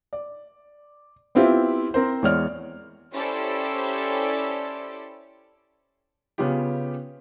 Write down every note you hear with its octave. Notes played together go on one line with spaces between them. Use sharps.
D5
B3 C4 E4 F4 G4 E5
C4 A#4 C5
E2 G#3 C#5 D5 F6
C#4 E4 G4 A4 C5 D5
C#3 B3 C#4 F4 G4